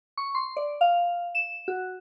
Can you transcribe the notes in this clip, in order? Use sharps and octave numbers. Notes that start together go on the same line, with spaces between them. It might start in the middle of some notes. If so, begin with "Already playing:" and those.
C#6
C6
D5
F5
E7
F#4